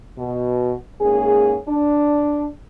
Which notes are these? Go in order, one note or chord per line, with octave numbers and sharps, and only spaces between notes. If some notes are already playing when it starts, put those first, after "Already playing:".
B2
G#2 A#3 C#4 G#4
D4